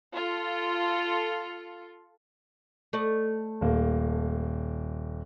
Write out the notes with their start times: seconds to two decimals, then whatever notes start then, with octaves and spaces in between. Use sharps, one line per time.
0.14 F4 A4
2.93 A3 D5 D#5
3.61 D#1 A#3